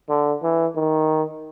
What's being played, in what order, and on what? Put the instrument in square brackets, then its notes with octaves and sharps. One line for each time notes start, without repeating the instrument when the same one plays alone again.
[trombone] D3
E3
D#3